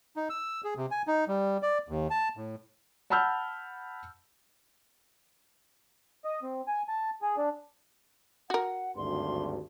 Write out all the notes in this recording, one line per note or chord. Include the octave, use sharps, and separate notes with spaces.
D#4
E6
G#4
C3
G#5
D#4
G3
D5
D#2
A5
A2
F#5 A5 B5 E6 F6 G6
D#5
C4
G#5
A5
G#4
D4
F#4 A#4 F#5
G#1 D2 G2 C6